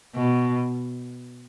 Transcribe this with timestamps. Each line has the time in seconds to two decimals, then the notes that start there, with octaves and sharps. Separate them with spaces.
0.16 B2